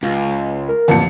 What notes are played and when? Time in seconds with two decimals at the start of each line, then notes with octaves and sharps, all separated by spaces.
0.03 C#2 F4
0.68 A#4
0.88 A1 F2 A#2 A5 C#7